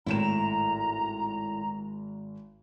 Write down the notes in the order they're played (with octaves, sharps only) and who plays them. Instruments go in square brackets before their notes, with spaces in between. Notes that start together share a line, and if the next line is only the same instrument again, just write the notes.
[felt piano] G#1 E7 [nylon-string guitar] A2 E4 [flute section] A#5